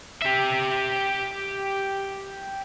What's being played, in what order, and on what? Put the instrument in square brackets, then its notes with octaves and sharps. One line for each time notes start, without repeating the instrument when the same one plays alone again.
[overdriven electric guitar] G4 E5